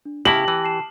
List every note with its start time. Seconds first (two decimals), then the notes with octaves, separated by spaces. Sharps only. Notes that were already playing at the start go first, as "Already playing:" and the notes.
0.05 D4
0.25 C#3 E4 G4 A5 A#6 F#7
0.48 E3
0.64 A5 C7 E7